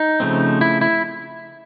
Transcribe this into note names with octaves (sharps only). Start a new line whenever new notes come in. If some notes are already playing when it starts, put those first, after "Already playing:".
Already playing: D#4
C#3 F3 A3 C4
E4
E4